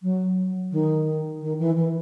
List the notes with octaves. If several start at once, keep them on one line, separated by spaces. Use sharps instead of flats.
F#3
D#3
D#3
E3
E3